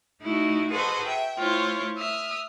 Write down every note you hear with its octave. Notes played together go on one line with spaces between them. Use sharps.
A3 D#4 E4 F#4
F#4 G#4 A4 B4 C5 D#5
E5 G5
A3 E4 F4 C5 C#5
E5 D#6 F6